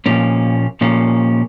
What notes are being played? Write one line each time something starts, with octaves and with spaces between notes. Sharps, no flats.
A#2 F3 A#3 C#4
A#2 F3 A#3 C#4